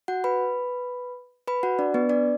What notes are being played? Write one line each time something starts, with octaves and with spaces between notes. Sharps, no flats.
F#4 F#5
B4 B5
B4 B5
F#4 F#5
D4 D5
B3 B4
D4 D5